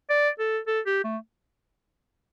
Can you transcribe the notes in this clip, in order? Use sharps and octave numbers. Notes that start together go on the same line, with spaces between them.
D5
A4
A4
G4
A3